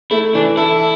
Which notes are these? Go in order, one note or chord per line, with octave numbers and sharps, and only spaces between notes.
A3 E4
E3 D4
E4 A4